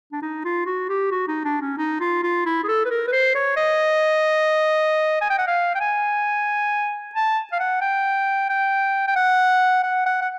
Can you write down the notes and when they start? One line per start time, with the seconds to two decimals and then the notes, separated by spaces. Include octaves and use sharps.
0.12 D4
0.22 D#4
0.45 F4
0.66 F#4
0.89 G4
1.11 F#4
1.28 D#4
1.45 D4
1.62 C#4
1.78 D#4
2.00 F4
2.23 F4
2.46 E4
2.64 G#4
2.68 A4
2.85 B4
2.90 A#4
3.08 B4
3.12 C5
3.35 C#5
3.57 D#5
5.22 G#5
5.30 G5
5.38 F#5
5.47 F5
5.75 G5
5.80 G#5
7.15 A5
7.52 F5
7.60 F#5
7.81 G5
8.49 G5
9.08 G5
9.16 F#5
9.83 F#5
10.06 F#5
10.21 F#5